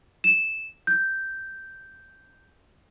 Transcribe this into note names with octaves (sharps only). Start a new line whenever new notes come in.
E7
G6